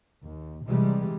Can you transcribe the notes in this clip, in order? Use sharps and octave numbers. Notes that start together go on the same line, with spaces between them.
D#2
C3 E3 G3 G#3